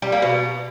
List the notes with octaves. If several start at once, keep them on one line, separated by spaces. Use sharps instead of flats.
G3
A#3
B2